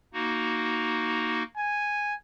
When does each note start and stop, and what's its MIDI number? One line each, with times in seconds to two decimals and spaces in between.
0.13 1.43 58
0.13 1.43 63
0.13 1.43 66
1.57 2.14 80